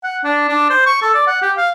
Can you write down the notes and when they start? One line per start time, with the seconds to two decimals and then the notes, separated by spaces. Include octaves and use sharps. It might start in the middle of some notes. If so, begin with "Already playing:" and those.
0.03 F#5
0.24 D4
0.48 D4
0.70 C5
0.86 C#6
1.01 A4
1.14 D5
1.27 F#5
1.42 G4
1.57 F5